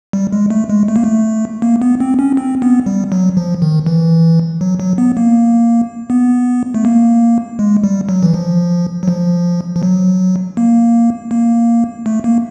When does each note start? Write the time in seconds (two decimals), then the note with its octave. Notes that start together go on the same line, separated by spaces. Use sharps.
0.13 G3
0.32 G#3
0.50 A3
0.69 G#3
0.88 A3
0.96 A#3
1.04 A3
1.62 A#3
1.82 B3
2.00 C4
2.19 C#4
2.37 C4
2.62 B3
2.86 G3
3.12 F#3
3.37 F3
3.62 D#3
3.86 E3
4.61 F#3
4.80 F#3
4.98 B3
5.17 A#3
6.10 B3
6.74 A3
6.85 A#3
7.59 G#3
7.84 G3
8.09 F#3
8.23 E3
8.34 F3
9.03 F#3
9.08 F3
9.76 F3
9.83 F#3
10.57 A#3
11.31 A#3
12.06 A3
12.24 A#3